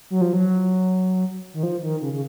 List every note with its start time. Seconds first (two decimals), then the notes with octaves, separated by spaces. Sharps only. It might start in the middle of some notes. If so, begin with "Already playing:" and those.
0.10 F#3
0.21 F3
0.33 F#3
1.54 D#3
1.63 F3
1.83 D#3
2.02 C#3
2.13 C#3